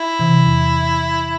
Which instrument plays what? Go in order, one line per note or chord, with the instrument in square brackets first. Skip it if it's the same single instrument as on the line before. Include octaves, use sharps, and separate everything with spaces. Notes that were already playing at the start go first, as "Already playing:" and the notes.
Already playing: [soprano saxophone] E4
[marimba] C3 E3
E2